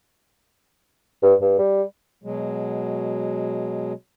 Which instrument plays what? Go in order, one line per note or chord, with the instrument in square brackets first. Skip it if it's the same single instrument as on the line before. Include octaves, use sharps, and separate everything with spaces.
[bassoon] G2
G2
G3
[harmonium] B2 F#3 G#3